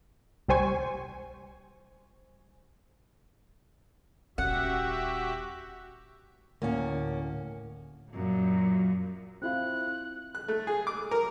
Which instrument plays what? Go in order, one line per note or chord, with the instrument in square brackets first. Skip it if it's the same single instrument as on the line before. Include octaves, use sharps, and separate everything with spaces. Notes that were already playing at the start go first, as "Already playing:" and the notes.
[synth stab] C2 G3 C5 G#5 C#6
[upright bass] D#1 C#4 [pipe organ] F#4 G4 E5 [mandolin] F#5
[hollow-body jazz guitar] D2 A2 [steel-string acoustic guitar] A#3 C#4
[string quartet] F#2 A#2
[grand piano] C4 E4 F4 [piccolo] F#6
[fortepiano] F#6
A3
G#4
D6
A#4